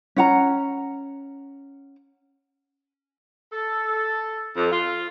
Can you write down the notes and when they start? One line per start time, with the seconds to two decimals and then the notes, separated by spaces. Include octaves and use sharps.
0.16 C#4 F#5 A#5
3.52 A4
4.56 F2
4.71 F4